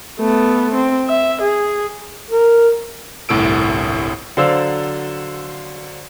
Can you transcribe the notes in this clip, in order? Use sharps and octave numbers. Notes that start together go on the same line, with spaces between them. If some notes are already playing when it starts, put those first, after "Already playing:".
A3 B3
C4
E5
G#4
A#4
G1 C2 A2 A4 E6 D7
D3 F#3 C5 D5 F5 E6